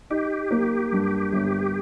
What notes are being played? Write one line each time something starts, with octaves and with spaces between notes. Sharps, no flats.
D#4 G4
A#3
G2
G1